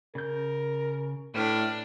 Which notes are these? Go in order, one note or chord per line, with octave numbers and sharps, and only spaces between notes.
C#3 A#4 G6
A2 D4 B4 E5 F6